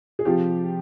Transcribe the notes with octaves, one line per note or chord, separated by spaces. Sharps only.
G#4
C3 F3 F4 G4